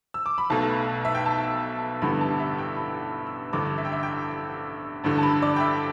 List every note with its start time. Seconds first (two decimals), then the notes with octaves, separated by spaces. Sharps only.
0.14 E6
0.26 D6
0.38 B5
0.50 B1 B2 A3 A5
1.05 E5
1.15 G5
1.26 A5
2.01 A1 G2 D3 G3 B3 B5
2.21 A5
2.40 E5
2.58 G5
2.76 B5
3.27 E6
3.53 A1 G2 D3 D6
3.78 E5
3.85 G5
3.92 E5
4.03 G5
5.04 A1 G2 D3
5.18 A5
5.23 B5
5.42 D5
5.56 G5
5.60 E5